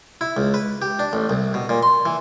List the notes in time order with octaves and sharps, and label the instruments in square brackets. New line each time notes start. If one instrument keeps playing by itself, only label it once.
[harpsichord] E4
C#2
B4
G4
D4
A1
C2
B2
A#2
C6
E3